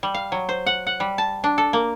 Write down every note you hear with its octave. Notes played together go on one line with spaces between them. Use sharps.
G3
F5
F#3
C5
F#5
F#5
G3
A5
D4
A4
A#3